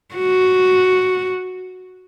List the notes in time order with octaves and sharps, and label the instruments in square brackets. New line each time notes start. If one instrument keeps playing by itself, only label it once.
[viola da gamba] F#4